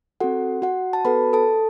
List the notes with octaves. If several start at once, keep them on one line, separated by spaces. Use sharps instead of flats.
C4 F#4 A4 F#5
F#4 F#5
A5
B3 F#4 A4 B4 B5
A4 A5